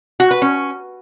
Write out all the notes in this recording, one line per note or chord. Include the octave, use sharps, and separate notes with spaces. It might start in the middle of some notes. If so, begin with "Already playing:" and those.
F#4
B4
C#4